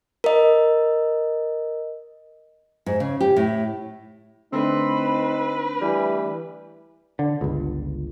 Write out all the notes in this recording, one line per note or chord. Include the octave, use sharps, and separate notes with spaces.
A#4 D#5
G#2
C#3
G4
A2
D3 A3 C4 D4 D#4 B4
E3 G3
D3
G1 C#2